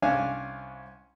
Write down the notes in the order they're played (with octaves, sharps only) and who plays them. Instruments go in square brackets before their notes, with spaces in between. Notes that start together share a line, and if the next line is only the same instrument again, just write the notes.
[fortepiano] C2 C#4 D4 F5 G#5